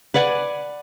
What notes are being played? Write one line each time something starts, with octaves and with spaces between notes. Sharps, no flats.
B4 D5 F#5 G#5